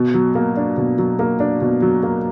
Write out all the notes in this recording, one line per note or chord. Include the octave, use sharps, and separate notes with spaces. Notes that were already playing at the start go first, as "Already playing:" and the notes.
Already playing: B2
F#3
A#3
D4
B2
F#3
A#3
D4
B2
F#3
A#3